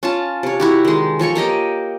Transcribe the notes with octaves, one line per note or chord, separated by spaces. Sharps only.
C#4 F4 A5
C3 C#5
E4 F#4 G4
D#3 G#3
F3 A4 C#5 C#6
A#3 G4 D#5 G5